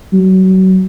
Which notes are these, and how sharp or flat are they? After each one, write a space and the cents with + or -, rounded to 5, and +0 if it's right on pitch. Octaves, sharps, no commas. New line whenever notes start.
F#3 +25